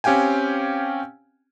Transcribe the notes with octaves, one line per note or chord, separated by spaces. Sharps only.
C4 C#4 G4 F5 G5 G#5